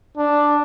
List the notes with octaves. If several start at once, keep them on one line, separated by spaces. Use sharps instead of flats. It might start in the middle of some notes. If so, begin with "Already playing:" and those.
D4